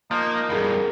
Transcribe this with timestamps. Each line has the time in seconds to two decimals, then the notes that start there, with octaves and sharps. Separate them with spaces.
0.11 F3 A#3 D#4
0.49 E2 G2 G#4 A#4 B5